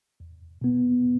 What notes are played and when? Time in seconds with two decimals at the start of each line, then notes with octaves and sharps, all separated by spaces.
0.20 E2
0.61 B2 B3